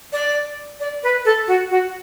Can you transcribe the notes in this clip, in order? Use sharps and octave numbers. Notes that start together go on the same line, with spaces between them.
D5
D5
B4
A4
F#4
F#4